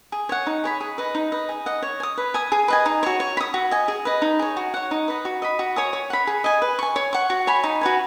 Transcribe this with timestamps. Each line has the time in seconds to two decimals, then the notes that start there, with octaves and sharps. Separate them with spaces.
0.12 G#4
0.29 C#5 F#5
0.47 D#4
0.64 G#4 C#5 B5
0.80 G#4
0.98 B4 D#5
1.15 D#4
1.32 B4 D#5
1.49 G#4
1.66 D#5 F#5
1.82 C#5
2.00 G#5
2.03 D#6
2.18 B4
2.34 G#5 D#6
2.52 G#4
2.68 B4 D#5 G#5
2.86 D#4
3.03 F#4 C#5
3.20 C#5
3.37 B5
3.41 D#6
3.54 F#4
3.71 D#5 G#5
3.88 G#4
4.05 B4 D#5
4.22 D#4
4.39 G#4 C#5
4.57 F#4
4.74 C#5 F#5
4.91 D#4
5.08 B4 D#5
5.25 F#4
5.42 D#5 B5
5.59 F#4
5.76 C#5 G#5 D#6
5.93 C#5
6.10 F#5 B5
6.27 G#4
6.44 D#5 G#5
6.62 B4
6.79 G#5 C#6
6.96 C#5
7.13 F#5 C#6
7.30 F#4
7.47 C#5 G#5 B5
7.64 D#4
7.81 F#4 B4 G#5